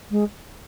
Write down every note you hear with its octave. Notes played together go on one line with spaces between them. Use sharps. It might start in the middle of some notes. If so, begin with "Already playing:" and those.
G#3